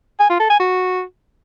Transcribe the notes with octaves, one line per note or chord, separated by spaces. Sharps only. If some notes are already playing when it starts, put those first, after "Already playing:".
G#5
F4
A4
G#5
F#4